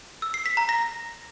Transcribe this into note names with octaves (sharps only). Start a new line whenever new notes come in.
E6
C7
B6
A#5
A#6